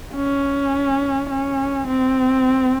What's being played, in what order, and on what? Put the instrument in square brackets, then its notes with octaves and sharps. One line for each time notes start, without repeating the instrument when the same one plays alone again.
[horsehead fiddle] C#4
C#4
C4